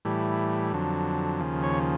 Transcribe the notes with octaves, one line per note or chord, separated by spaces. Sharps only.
A2 E3 G3
F2 D3 F#3
D#2 C#3 F3
C#5